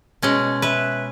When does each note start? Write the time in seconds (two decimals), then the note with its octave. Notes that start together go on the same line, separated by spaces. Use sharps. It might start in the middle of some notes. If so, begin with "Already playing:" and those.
0.22 B2 G#3 C#4
0.62 B4 E5